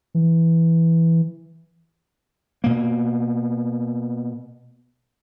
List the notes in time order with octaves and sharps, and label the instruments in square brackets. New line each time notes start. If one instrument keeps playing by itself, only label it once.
[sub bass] E3
[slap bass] B2 A#3